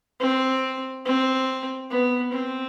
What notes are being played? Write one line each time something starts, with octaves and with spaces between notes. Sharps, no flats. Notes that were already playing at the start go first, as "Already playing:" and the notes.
C4
C4
B3
C4